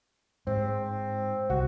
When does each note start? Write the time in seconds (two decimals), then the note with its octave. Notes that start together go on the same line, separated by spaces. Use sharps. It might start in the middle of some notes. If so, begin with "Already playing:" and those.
0.47 G#2 C4
1.50 C2 F#4